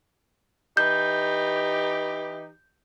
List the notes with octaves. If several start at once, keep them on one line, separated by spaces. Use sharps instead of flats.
E3 D#4 G4 G6